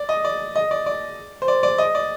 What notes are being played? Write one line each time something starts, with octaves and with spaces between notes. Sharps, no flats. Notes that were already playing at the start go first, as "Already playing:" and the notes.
Already playing: D5
D#5
D5
D#5
D5
D5
C5
D5
D5
D#5
D5